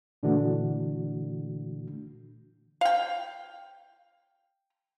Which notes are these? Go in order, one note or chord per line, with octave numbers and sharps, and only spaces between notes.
A#2 D3 E3 A3 D4 F#4
F5 G5